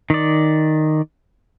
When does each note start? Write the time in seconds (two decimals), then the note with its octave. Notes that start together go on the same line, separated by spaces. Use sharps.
0.10 D#3 D5